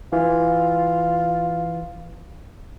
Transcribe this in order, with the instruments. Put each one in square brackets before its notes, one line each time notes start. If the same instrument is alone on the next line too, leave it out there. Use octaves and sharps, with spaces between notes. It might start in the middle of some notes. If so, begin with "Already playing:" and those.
[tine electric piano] E3 [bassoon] F4